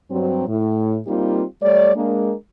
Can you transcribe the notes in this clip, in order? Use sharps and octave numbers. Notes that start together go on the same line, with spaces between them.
G2 F#3 C4
A2
G3 A#3 C4 D#4 F4 G4
G3 A3 C#5 D5
G#3 A#3 D4